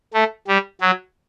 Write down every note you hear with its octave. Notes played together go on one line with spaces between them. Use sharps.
A3
G3
F#3